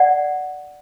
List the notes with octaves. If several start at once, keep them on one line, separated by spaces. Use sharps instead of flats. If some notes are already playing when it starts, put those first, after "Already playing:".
Already playing: D5 F#5